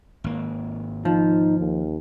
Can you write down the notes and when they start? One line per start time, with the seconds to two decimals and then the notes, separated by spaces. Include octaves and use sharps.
0.24 G#1 A#3
1.05 F3 D#4
1.59 D#2